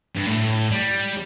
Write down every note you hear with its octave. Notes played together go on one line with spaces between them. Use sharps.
G2
A2
G3